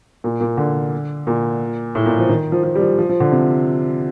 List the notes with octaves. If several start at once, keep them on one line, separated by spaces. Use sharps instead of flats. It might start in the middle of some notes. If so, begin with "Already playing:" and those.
A#2
A#2
D3
A#2
A2
A#2
F3
D#3
F3
F3
G3
F3
F3
F3
D3
C3